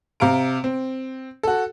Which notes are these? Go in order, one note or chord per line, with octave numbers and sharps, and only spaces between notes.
C3 F5 A#5 D7
C4
F#4 A4